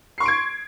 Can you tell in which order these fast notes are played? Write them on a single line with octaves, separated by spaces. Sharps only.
C7 C#6 C6 D7 G#6